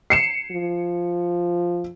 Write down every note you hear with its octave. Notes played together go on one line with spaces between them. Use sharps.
C7 C#7 E7
F3